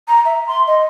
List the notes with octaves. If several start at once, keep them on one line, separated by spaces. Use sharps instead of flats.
A#5
E5
C6
D#5